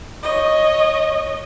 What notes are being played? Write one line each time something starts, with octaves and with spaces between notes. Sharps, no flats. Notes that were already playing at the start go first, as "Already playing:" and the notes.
C#5 D#5